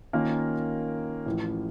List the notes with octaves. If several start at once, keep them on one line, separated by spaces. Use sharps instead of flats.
D#3 A#3 C#4 F4 A#4
A1 A2 F3